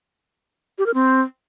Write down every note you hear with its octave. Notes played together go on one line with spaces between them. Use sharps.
G4
A#4
C4